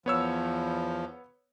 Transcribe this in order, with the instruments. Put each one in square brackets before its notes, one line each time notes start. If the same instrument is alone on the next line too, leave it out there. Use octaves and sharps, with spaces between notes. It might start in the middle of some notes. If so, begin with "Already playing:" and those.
[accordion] E2 F3 [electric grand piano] B3 C#5 E6